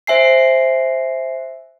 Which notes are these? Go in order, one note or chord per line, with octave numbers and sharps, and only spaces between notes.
C5 E5 G#5 C7